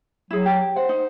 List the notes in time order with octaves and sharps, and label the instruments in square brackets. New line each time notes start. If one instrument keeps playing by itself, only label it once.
[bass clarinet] F#3 [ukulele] E4 G#4
[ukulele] G4
[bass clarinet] C5 [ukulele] F#5
[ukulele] D#4